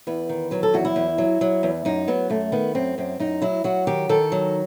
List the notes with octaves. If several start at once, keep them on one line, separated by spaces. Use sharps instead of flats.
E2 B4
D#3
F#3 B4
A4
E2 F#4
E4
E2
F#3
F#3
E2
F#2 D#4
F#3 B3
F#2 A3
D#3 B3
F#2 C4
F#2 C4
F#2 D#4
F#3 E4
F#3 F#4
D#3 G4
D#3 A4
F#3